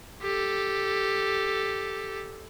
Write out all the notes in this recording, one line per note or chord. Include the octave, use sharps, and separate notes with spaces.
G4 A4